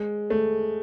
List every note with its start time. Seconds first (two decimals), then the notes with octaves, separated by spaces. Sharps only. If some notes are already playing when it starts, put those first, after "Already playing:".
Already playing: G#3
0.30 A3